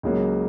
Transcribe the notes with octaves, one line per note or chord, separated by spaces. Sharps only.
C#2 C#3 F#3 A#3